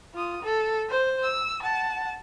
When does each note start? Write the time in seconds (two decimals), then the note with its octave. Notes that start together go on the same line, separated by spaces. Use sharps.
0.14 F4 D#6
0.43 A4
0.89 C5
1.23 E6
1.63 F#5 A5